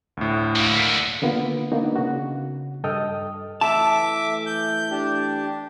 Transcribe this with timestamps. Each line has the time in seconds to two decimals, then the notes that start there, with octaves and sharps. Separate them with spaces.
0.17 D2 A2
0.56 D3 A#3
0.76 B6 D7
1.22 D3 A#3 B3 F4
1.72 A#3 B3 D4 D#4 F#4
1.96 C#3 F#4
2.84 G2 A4 D#5 G5 D#6 F6
3.61 E3 A3 E5 A5 D6
4.46 G6
4.91 D4 G4